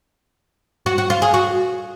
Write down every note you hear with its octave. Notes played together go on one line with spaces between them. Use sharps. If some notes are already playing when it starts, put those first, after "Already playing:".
F#4
F#4
F4
G#4
F#4